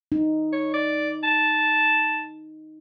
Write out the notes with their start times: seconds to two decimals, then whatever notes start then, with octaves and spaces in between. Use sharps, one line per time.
0.12 D#4
0.53 C#5
0.74 D5
1.24 A5